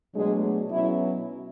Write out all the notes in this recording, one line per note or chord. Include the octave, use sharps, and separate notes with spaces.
B2 F#3 G#3 A3 D4 G#4
B2 F#3 C#4 E4